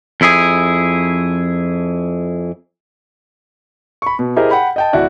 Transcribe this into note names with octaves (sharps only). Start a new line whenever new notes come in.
F2 E4 G#4
B5 C#6
B2
E4 G4 G#4 A#4 C5 D#5
F#5 G5 B5
D#5 G5 A5
D1 E4 F#4 D5